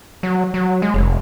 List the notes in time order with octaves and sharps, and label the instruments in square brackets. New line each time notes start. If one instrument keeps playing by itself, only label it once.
[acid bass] F#3
F#3
G#3
F1